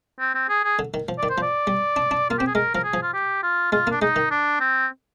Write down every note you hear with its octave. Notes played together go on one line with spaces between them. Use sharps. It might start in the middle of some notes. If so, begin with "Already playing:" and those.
C4
C4
G#4
G#4
D3
D#3
F3
D#3 D5
C5
F3
D5
G3
D4
D4
A#3 F4
C4 G4
G#4
G#3 A#4
F3 A#4
G#4
F3
F4
G4
F4
G#3 F4
A#3
D4
G#3 D#4
D#3
D4
C4